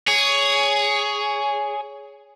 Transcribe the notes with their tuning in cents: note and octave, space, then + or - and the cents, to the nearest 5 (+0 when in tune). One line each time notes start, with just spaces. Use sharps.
G#4 +0 C#5 +15